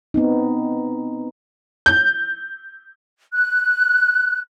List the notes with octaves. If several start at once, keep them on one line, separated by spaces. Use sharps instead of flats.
B3 C4 D#4
G6
F#6